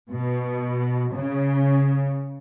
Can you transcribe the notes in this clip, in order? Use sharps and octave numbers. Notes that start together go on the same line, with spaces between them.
B2
C#3